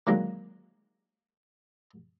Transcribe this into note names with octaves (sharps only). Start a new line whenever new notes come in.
D3 D#3 F#3 G#3 A#3